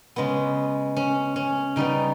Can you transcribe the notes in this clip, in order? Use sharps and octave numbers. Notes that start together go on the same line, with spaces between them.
C#3 G#3 B3
C#4
C#4
C#3 G3 B3 D#4